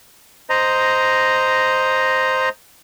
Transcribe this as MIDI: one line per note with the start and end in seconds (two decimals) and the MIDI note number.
0.50 2.49 72
0.50 2.49 75
0.50 2.49 82